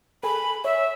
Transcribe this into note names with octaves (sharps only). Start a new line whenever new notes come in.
G#4 A4 G#5 B5
C#5 E5